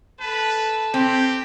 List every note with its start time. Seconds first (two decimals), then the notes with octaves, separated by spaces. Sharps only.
0.20 A4 B4 A5
0.94 C4 G4